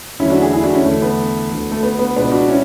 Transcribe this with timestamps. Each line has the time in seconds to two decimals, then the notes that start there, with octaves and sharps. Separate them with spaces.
0.19 E2 D3 F#3 A3 C#4 E4
0.30 D4 F#4
0.42 E4 G#4
0.53 E4 G#4
0.63 D4 F#4
0.74 C#4 E4
0.85 E2 D3 A3
1.02 B3
1.51 D2 D3 A3
1.72 A3
1.83 B3
1.99 B3
2.16 C#2 B2 G#3 B3 D4
2.32 D4 F#4
2.49 C#4 E4